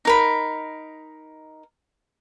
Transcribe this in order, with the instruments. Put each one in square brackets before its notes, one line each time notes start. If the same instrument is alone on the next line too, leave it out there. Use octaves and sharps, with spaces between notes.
[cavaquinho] D#4 A#4 B5